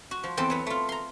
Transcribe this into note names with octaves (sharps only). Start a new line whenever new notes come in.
F#4
F3
E2 C4 A4 G5
F#3 B3
A3 F4
A#5 C6